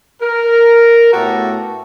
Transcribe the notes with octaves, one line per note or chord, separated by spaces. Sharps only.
A#4
A2 A3 B3 F#4 G4 A4